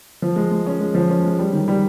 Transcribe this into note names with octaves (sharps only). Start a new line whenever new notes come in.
F3
G#3
G#3
C#4
G#3
F3
C#4
G#3
G3
D#3
G3